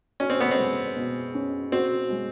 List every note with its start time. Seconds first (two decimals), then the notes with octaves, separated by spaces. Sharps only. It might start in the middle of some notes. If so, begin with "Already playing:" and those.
0.20 C#4 F#4
0.30 C4
0.40 B3
0.51 C4
0.57 G#3
0.96 B2
1.34 C#4
1.72 C4 F#4
2.10 G#3